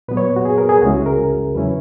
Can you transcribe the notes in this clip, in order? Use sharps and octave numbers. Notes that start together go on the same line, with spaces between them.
A#2 F#3 B3 B4
C#5
F#4
G#4
A#4
G#4
C#2 C#3 G#3 C#4 E4 F#4
G#4
A#4
E2 C#3 F#3 C#4 E4 B4